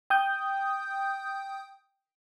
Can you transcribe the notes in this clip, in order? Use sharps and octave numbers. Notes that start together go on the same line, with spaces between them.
G5 D#6 G6